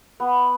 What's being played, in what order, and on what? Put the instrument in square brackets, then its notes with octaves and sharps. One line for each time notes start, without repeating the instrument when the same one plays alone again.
[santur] B3